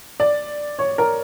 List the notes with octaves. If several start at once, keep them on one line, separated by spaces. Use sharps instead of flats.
D5
C#5
A#4